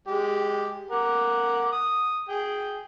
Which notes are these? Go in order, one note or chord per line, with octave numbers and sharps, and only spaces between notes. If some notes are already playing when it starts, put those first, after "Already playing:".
G#3 G4
A#4 F#5 D6
D#6
G#4 G5